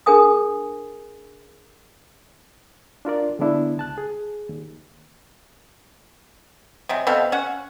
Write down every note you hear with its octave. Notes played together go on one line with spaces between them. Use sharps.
D4 G#4 A#4 G#5 D#6
D4 F4 A#4 D5
D3 G#3 B3 D4 E4
C#2 A5 F#6
G#4
D#2
C3 F#3 G#3
B2 C4 A4 F5
C#4 F#4 F#5